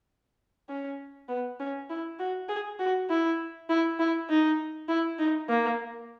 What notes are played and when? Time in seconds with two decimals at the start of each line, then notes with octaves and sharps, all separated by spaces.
0.69 C#4
1.29 B3
1.60 C#4
1.90 E4
2.19 F#4
2.49 G#4
2.79 F#4
3.10 E4
3.69 E4
3.99 E4
4.30 D#4
4.89 E4
5.19 D#4
5.49 A#3